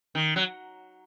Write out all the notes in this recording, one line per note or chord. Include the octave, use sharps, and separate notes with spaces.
D#3
F#3